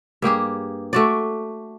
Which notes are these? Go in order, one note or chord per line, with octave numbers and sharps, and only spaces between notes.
G2 A#3 G4 G#4
A3 F#4 D5